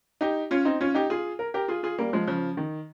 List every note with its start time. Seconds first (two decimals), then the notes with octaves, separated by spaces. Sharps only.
0.21 D#4 G4
0.51 C#4 F4
0.65 C4 D#4
0.81 C#4 F4
0.94 D#4 G4
1.10 F4 G#4
1.39 A#4
1.54 G4 A#4
1.68 F4 G#4
1.83 F4 G#4
1.98 G3 A#3
2.13 F3 G#3
2.27 C#3 F3
2.57 D#3